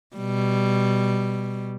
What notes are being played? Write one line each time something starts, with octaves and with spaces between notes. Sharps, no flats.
B2 G3